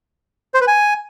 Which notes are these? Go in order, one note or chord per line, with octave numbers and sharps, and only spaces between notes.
C5
B4
G#5